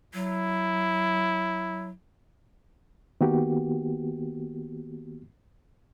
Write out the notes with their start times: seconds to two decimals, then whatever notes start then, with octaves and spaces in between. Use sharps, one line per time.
0.14 F#3 E4
3.21 D#3 A#3 B3 F#4 G4